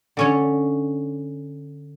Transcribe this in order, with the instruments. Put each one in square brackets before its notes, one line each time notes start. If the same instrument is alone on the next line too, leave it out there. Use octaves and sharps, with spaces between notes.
[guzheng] D3 C#4 C#5